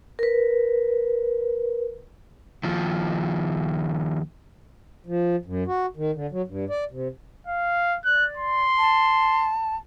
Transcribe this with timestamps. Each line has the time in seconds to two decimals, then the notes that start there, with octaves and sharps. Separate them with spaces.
0.19 A#4 B4
2.63 D#2 F3
5.06 F3
5.45 F#2
5.67 F#4
5.97 D#3
6.15 D3
6.31 F#3
6.48 G2
6.69 D5
6.91 C3
7.47 F5
8.05 D5 F#6
8.37 C6
8.77 A5